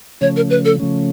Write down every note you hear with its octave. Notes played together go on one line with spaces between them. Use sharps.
C#3 F3 A3 C#4 C#5
A#4
B4
A4
C#3 F3 A3 C#4